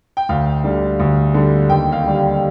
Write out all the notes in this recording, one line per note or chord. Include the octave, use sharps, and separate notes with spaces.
G5
D2 F5
D3 G3
D2
D3 G3
D#2 G5
F5
D3 G3
F5